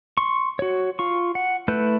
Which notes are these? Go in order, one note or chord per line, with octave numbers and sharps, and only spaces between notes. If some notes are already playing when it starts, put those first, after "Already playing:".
C6 C#6
F#4 C#5
F4 C#6
F#5
A3 E4 B4 F#6 G6